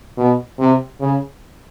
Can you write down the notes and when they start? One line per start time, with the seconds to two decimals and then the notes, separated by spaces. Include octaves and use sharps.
0.17 B2
0.59 C3
1.00 C#3